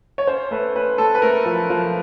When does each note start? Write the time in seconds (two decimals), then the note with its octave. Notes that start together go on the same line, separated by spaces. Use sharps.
0.18 C#5
0.27 C#4 C5
0.51 A3 B4
0.76 C#4 B4
0.98 A3 A4
1.15 B4
1.22 A3 A#4
1.46 F3
1.70 F3